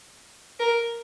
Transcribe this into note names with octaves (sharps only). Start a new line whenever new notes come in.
A#4